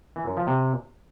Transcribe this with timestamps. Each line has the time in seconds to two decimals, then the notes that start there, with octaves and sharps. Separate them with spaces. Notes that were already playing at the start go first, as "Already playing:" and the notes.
0.16 E3
0.26 F#2
0.37 F3
0.47 C3